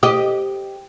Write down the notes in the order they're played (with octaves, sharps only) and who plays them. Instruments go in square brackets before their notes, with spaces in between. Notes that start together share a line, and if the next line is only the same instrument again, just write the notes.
[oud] G4 D#5